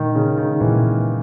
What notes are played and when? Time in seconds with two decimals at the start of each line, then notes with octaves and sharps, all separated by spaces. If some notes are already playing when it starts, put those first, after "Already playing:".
Already playing: A#2 D#3 G#3
0.15 C#3
0.38 D#3
0.60 A#2 E3 G#3 B3